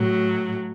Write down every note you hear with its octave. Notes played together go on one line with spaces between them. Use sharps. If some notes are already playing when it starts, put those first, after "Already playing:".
Already playing: A2 F#3